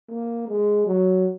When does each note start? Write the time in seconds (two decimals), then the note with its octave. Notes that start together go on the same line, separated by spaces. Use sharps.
0.10 A#3
0.48 G#3
0.87 F#3